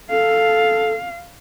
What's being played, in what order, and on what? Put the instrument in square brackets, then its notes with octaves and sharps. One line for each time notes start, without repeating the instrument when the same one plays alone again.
[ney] A4 [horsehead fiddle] F5